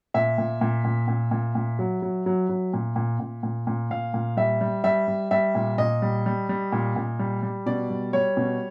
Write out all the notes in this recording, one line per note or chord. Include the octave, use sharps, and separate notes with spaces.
A#2 E5
A#2
A#2
A#2
A#2
A#2
A#2
F#3
F#3
F#3
F#3
A#2
A#2
A#2
A#2
A#2
A#2 F5
A#2
G3 E5
G3
G3 E5
G3
G3 E5
A#2
A#2 D#5
G3
G3
G3
A#2
A#2
G3
G3
B2 D5
G3
G3 C#5
B2